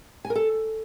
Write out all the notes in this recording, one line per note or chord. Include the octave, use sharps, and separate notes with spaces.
G#5
A#4
A4